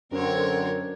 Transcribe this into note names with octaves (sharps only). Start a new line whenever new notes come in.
F#2 D3 C4 D4 A#4 C#5